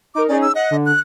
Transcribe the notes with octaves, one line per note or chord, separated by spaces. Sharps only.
D#4 A#4 D6
C#4 D#4 G#4 D5
E6
D#5 F#5
D3
F#6